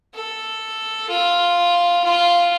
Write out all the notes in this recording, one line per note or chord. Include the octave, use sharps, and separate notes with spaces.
A4
F4
F4